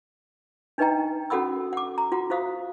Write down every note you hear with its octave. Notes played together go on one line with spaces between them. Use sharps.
D4 D#4 B4 D#5 G5 A#5
C#4 F#4 A4 F#5 B5 E6
F#5 D6
A#5
F4 F#4 F#5
F4 C5 F5 D#6